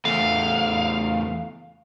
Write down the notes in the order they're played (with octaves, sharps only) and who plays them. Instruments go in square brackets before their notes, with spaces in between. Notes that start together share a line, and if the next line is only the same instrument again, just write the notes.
[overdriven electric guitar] E2 A3 [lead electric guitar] F5